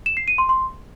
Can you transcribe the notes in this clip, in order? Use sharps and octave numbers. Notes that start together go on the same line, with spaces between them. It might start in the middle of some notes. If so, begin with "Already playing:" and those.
E7
C7
D#7
C6
C6